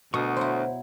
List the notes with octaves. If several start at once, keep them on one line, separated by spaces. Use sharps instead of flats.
D2 B2 C#6 D#6
F#3 E4 C5